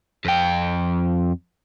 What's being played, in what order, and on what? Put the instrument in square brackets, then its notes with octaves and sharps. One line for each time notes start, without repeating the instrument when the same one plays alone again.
[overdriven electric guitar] F2 G5